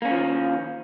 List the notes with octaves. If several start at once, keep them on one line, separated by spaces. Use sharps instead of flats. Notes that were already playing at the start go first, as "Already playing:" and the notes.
D3 D#3 F3 A#3 C#4